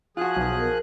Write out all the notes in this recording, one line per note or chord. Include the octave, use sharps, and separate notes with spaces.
F3 F4 F#4 G#4 F#6
B1
A#4